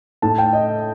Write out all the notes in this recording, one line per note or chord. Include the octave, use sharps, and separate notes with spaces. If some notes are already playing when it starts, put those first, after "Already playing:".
A2 A5
G5
D#5